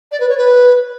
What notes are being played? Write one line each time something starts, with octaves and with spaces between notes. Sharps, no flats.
D5
B4
C#5
B4